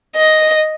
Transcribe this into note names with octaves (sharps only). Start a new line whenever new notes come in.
D#5